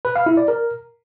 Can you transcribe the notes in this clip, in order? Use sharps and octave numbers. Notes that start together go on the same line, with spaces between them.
B4
F5
E4
D5
A#4